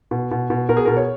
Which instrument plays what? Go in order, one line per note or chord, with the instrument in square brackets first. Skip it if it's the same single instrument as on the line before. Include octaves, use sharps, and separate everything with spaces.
[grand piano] B2
B2
B2
B2 A#4
G#4
B2 A#4
C#5